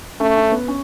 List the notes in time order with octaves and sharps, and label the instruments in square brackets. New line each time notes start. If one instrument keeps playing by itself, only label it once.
[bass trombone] A3 [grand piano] C#4
[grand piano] C#4
B3
C#4